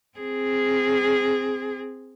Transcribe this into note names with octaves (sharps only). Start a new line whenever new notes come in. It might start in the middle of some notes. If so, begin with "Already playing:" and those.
C4 G#4